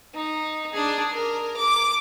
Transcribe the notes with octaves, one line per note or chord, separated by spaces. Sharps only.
D#4
D4 G#4
A#4
D6